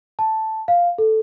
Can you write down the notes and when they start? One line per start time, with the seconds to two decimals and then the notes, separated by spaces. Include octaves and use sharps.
0.19 A5
0.68 F5
0.98 A4